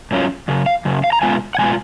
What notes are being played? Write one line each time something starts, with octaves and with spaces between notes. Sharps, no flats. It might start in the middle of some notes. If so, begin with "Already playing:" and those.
G#2 F#3 C#4 F4
F#2 C#3
F5
F#2 C#3
F5
A#5
B2 G#3 B3 F4 G#5
F#5
B2 G#3 B3 F4 G#5